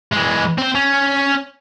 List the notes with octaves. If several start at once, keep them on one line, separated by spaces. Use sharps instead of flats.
E3 G#3
C4 C5
C#4